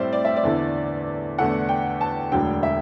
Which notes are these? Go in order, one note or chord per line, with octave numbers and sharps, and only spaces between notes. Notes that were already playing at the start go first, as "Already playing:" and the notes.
Already playing: A2 G3 C4 C5 D5 E5
D5
E5
D5
E2 D3 A3 E4
E2 D3 A3 E4 F#5
G5
A5
E1 D2 D3 F#3 G5
E5